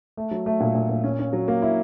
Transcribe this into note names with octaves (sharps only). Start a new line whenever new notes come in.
A3
F#3
A3
A#2
A#2
A#2
C#4
C#4
F#3
A#3
E4